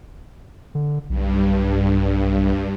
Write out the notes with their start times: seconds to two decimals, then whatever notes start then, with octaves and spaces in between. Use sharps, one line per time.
0.75 D3
1.10 B1 G2